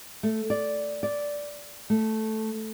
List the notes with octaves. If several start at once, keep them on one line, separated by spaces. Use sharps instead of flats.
A3
D5
D5
A3